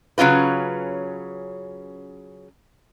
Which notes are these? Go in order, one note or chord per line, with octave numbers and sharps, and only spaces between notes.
C#3 F#3 C#4 F4 B4